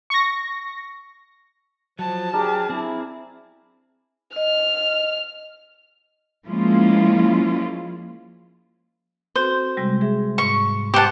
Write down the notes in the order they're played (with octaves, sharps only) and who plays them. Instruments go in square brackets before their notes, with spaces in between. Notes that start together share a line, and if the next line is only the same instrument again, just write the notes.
[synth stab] C#6 A#6
[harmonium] F3 [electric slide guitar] F#3 [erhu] A5
[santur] D4 A#4 [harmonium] G4 G#4
[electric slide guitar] C4 G#4 [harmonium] E4
[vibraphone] D#5 [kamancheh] F6
[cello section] F3 G#3 A#3 C#4 E4 F4
[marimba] C4 F#4 A4 [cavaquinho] C5
[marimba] C3 G3 G#3
G#4 E5
[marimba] G#2 [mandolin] C#6
[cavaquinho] G4 A5 [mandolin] C5 F#5